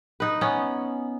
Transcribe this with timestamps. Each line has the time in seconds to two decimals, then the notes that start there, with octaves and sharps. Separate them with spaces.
0.20 D#4 B4
0.41 B3 C#4